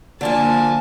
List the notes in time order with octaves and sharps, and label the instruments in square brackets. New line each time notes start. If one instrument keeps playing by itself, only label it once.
[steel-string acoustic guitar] D3 F3 A#3 [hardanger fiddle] G#5 A5